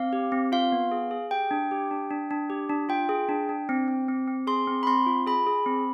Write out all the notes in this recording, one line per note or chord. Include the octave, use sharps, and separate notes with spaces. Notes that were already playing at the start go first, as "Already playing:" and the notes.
Already playing: C4 F5
G4
C4
F4 F5
B3
G#4
G#4
G4 G5
D4
G4
D4
D4
D4
G4
D4
F4 G5
G#4
D4
D4
C4
C4
C4
C4
G#4 C6
C4
B5
C4 C6
F4
G#4 B5
G#4
C4